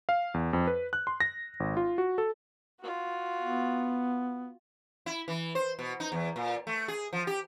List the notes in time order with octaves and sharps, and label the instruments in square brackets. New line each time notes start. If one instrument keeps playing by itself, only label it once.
[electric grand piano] F5
E2
F2
B4
F#6
C6
A#6
G#1
F4
F#4
A4
[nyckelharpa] F4 F#4
[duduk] B3
[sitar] E4
E3
C5
B2
D#4
E2
A#2
A3
G#4
F3
G4